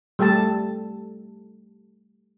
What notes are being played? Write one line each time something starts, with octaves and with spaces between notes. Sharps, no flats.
G3 A3 G4 A4 A5